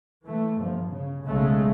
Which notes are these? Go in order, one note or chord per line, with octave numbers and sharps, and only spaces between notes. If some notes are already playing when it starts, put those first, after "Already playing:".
E3 A3
G1 F3
C#3
B1 C#3 G#3 A3